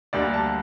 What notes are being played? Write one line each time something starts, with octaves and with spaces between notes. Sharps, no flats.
D2 D3 G3 A#3 D5
A5